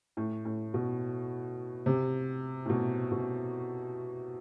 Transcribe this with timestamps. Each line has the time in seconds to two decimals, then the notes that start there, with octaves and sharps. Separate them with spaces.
0.17 A2
0.45 A2
0.74 B2
1.86 C3
2.65 A2
2.70 B2
3.11 B2